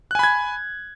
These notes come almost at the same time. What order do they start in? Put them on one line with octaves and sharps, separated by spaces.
F#6 G#5 B5 G#6